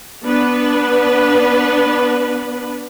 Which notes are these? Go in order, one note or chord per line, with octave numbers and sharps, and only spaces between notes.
B3 D4 B4